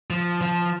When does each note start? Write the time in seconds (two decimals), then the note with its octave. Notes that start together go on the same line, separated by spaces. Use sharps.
0.10 F3
0.42 F3